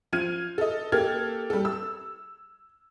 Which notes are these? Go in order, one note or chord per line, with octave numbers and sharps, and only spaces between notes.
F3 F6 G#6 D#7
A4 D#5
A#3 G4 A4 F6 G#6
G3 A4
E6